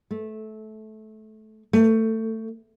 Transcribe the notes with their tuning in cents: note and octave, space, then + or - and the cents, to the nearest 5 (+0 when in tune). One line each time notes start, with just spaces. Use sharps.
A3 -20
A3 +20